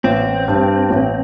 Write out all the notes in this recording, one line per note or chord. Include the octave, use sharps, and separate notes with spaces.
A1 C4
G2
A1